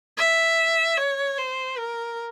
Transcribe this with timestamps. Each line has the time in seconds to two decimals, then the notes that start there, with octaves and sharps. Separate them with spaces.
0.18 E5
0.97 C#5
1.38 C5
1.78 A#4